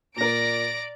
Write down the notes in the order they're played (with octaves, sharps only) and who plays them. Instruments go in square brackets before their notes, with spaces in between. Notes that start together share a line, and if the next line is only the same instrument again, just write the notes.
[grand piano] A#2 A#4 [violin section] D5 D7 [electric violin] A#5 A#6